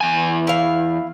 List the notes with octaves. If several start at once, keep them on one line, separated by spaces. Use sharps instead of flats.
E2 G#5
E4 F5